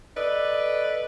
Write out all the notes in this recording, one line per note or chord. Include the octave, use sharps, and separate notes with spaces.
A4 B4 D5 D#5